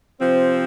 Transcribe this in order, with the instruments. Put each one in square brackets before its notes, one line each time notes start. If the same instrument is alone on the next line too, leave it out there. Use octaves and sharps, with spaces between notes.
[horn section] C3 F3 C4